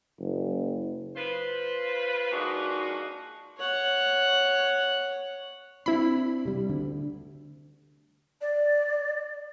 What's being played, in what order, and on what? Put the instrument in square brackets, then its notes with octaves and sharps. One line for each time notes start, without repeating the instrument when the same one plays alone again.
[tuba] F#1
[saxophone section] F4 B4 C5
F3 G#3 A#3 D4 D#4 F#4
[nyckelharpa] C#5 F#5
[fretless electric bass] C4 D4 [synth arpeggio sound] E4 B5
[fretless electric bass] C3 G3
D2 D3
[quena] D5